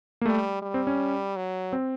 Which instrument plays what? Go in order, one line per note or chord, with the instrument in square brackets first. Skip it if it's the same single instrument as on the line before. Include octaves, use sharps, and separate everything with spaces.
[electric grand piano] A#3
[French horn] G3 [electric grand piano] A3
[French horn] G3
[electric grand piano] C4
C#4
[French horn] F#3
[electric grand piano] C4